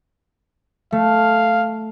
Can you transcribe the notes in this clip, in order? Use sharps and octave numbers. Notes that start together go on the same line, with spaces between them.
A3 F5